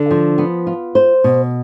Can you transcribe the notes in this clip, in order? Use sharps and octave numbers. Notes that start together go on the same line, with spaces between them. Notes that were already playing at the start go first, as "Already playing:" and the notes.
Already playing: D3
F3
B3
F4
C5
B2